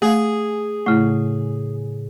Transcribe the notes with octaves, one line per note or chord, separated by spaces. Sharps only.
A3 G#4 F5
A2 C#3 A3 E4